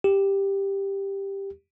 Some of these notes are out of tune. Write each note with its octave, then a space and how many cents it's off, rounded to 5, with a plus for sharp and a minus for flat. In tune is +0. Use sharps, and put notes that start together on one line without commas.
G4 +5